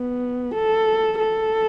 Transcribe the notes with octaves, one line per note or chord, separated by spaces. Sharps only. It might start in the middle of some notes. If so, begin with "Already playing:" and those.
Already playing: B3
A4
A4